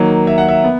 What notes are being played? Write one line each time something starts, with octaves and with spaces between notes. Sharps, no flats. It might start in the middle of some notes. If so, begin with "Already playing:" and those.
Already playing: D#3 F#3 A#3
E5
F#5
E5
B3